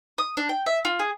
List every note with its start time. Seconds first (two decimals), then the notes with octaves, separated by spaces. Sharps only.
0.18 D#6
0.37 D4
0.49 G5
0.66 E5
0.85 F4
0.99 G#4